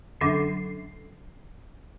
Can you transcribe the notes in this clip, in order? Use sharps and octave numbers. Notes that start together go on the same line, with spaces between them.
F#2 D3 C7